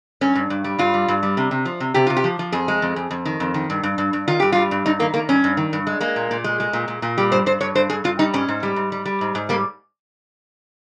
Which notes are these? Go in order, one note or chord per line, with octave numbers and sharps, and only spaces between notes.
G2 C#4
G2
G2
G3
G2 F4
G3
G2
G3
C3
C3
F3
C3
C3 G4
C3 F4
G4
F3
F3
F2 G#4
G#3
F2
F2
F2
D#3
F2
D#3
G2
G2
G2
G2
D#3 F4
G2 G4
G3 F4
G2
G2 D#4
D#3 A#3
D#3 A#3
G2 C#4
G2
D#3
G2
G#3
G#3 A#3
A#2
A#2
G#3
G#3
A#2
A#2
A#2
G3 G4
G2 C5
G2 C5
G2 C#5
G2 C5
G2 G#4
G2 F4
G3 D#4
G#2 C#4
G#2
G3
G#2
G3
G3
G#2
G#2
G3 A#3